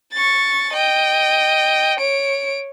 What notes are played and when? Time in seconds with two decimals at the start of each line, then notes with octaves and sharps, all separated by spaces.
0.13 C#6 A6
0.73 D#5 G5
1.99 C#5 D7